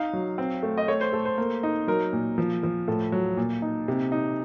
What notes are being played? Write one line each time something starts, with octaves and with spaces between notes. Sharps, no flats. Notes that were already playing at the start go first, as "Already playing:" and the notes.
Already playing: D#4 F5
F#3
C4
A3
D#5
A3 C#5
C5
A3 A4
C5
A#3
D#4
F#3 A#4
A#2
F3
F3
A2 A4
F#3
A#2
D#4
C3
D#4